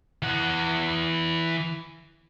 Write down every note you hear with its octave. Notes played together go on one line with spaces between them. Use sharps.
E3 F#5